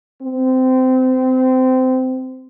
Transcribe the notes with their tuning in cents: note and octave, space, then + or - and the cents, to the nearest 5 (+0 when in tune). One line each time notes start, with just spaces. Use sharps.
C4 -20